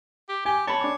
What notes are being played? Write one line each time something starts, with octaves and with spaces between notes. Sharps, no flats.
G4
G4 G#5
C#5 A5 B5
D4 D6